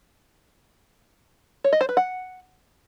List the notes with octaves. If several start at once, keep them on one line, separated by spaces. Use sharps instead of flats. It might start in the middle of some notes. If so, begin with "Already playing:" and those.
C#5
D#5
C5
B4
F#5